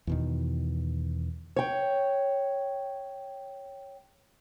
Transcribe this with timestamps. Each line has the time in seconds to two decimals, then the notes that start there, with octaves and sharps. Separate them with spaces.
0.07 E2 B2 D#3
1.56 C#5 G5